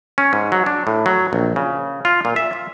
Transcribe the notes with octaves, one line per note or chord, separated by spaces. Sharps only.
C#4
G#2
F#3
D4
A2
F#3
A#1
C#3
F4
A#2
E5
F4